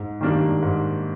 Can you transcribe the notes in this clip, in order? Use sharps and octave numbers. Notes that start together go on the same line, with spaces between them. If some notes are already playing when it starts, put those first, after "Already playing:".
Already playing: G#2
D#3 G3 A#3 D4
G#2